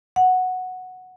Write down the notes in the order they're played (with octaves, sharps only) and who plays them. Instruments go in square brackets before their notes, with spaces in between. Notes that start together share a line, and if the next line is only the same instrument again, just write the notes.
[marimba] F#5